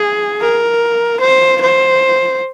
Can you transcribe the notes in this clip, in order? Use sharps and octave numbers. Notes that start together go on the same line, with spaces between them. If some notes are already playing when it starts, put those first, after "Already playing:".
Already playing: G#4
A#4
C5
C5